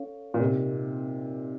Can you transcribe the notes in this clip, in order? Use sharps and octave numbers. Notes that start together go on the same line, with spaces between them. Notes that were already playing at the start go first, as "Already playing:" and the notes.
Already playing: C#4 A4 C#5 F5
A#2
C3 C4 D#4 A#4 D#5